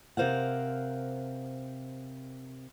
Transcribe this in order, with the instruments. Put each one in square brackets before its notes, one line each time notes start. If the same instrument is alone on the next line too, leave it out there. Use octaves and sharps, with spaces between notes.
[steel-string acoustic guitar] C3 A#4 C5 F5 F#5